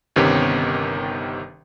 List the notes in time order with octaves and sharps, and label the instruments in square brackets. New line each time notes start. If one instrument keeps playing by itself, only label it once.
[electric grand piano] G1 C3 D#3 B3 C#4 G4